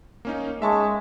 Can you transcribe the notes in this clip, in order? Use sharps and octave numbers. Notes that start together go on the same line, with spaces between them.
A#3 C#4 D#4
G#3 E5 A5 C#6